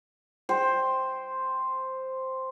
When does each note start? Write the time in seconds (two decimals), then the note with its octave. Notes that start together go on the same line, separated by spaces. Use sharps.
0.49 C5 G5